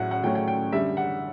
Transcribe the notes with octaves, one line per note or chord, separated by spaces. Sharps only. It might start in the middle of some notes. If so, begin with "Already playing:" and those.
Already playing: A2 F#3 A3 C#4 F#5
F#5
A2 F#3 A3 C#4 G5
G5
G5
F#2 D3 G3 E5
F#5